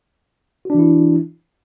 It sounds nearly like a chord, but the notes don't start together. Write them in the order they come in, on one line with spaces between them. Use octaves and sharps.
F#4 D4 E3 E4